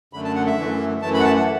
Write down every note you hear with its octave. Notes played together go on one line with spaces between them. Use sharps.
F#2 D3 A3 B5
A5
F#5
E5
F#2 E3 A3
F#2 E3 A3 A5
B5
F#5
A5
F#5